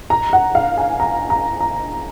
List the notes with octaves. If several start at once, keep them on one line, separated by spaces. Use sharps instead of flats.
A#5
F#5
F5
G#5
A#5
A#5
A#5